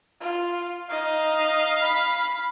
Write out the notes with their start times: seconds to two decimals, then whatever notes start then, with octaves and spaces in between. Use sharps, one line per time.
0.21 F4
0.89 D#4 D#5 F5
1.82 B5